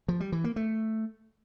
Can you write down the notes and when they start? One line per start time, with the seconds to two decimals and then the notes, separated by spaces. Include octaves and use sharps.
0.08 F3
0.20 G3
0.32 E3
0.44 A#3
0.56 A3